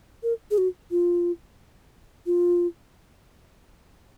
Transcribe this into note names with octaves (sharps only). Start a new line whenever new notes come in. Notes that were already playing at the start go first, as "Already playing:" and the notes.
A#4
G#4
F#4
F4
F4